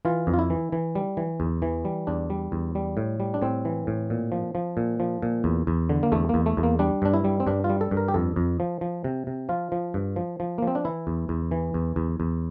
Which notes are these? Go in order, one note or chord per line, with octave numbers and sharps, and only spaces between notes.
E3 F4
F2
F4
E4
E3
E3
G3
E3
E2
E3
G3
E2 D4
G3
E2
G3
A2
G3
D4
A2 C4
E3
A2
A#2
F3
F3
A#2
F3
A#2
E2
E2
D3
A#3
E2 A3
E2 A#3
A3
E2
A#3
G3 D4
G2 D4
E4
G3
C4
G2 D4
F4
G3
A4
G2
A#4
G4
F2 A4
F2
F3
F3
C3
C3
F3 F4
F3
G2
F3
F3
A#3
F3 C4
D4
E3 E4
E2
E2
E3
E2
E2
E2